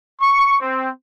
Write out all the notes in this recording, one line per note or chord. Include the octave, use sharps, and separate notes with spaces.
C#6
C4